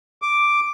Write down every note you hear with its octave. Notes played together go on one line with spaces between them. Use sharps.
D6